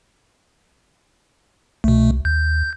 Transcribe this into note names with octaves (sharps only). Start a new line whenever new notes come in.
C2 B2 A3
D#2 G6